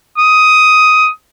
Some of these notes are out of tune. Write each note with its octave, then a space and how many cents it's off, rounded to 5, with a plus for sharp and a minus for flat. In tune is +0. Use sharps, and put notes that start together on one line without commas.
D#6 +10